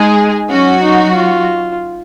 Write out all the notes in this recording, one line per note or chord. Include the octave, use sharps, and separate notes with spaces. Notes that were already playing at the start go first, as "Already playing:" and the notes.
Already playing: G#3 D#4 G#4
F#3 C#4 F#4
D#4
F4